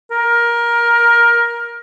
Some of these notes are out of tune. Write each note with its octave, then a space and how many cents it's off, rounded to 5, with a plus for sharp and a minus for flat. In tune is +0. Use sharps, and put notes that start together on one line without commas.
A#4 +15